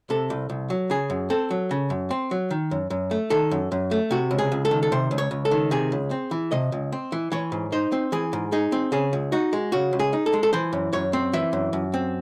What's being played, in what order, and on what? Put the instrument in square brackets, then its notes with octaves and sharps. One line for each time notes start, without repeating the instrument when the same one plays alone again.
[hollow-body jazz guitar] C3 A4
C2
C2
F#3
C#3 G#4
F#2
C4 A4
F#3
C#3
F#2
C4
F#3
D#3
F#2
F#2
A3
D#3 A4
F#2
F#2
A3
C3 F#4
C#2
G#4
C#2
A4
D#3
A4
C3 C5
C#2
C#5
C#2
A4
D#3
C3 G#4
C#2
C4
E3
C3 D#5
C#2
C4
E3
E3 C#5
G#2
D#4 C5
C4
E3 G#4
G#2
D#4 G#4
C4
C#3 G#4
C#2
D#4 F#4
G#3
C#3 F#4
C#2
G#4
D#4
A4
G#3
A4
E3 C5
F#2
F#2 C#5
C4
E3 E5
F#2
F#2
C4